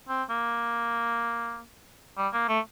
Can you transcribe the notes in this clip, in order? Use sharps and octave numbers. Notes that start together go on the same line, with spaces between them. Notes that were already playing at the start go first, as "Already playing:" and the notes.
C4
A#3
G3
A#3
A3